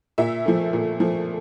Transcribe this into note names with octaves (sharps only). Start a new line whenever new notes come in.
A#2 E5
F3 A3
A#2
F3 A3